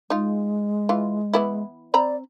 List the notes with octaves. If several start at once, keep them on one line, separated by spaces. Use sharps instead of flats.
G#3 D#4 F4
E3 F4
E3 B3 E4
C4 D5 A#5 B5